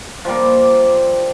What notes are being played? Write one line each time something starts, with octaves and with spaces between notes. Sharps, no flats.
F3 G3 A#3